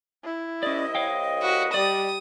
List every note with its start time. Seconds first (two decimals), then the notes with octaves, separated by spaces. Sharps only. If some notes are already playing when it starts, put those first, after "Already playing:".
0.24 E4
0.63 C2 C#4 D5 D#5
0.95 C#5 F5 G5
1.42 F#4 B4
1.74 G3 D5 D#6